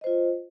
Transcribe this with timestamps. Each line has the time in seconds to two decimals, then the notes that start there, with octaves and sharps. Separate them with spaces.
0.01 D#5
0.04 C5
0.07 F4